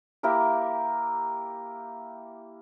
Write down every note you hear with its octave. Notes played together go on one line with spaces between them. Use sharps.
A#3 E4 G4 A#4